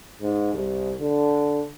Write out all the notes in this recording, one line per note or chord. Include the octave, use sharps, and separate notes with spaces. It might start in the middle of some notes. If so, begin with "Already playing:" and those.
G#2
C2
D3